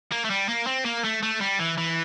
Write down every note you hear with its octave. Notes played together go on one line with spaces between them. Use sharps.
A#3
A3
G3
A#3
C4
A#3
A3
A3
G3
E3
E3